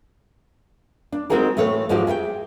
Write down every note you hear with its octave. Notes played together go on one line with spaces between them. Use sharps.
D4
G#3 C4 D#4 F#4 G#4 A#4
A2 E3 A3 C#5
G#2 F3 G#3 D4 F#4 G4
G#4 E5 F#5 G5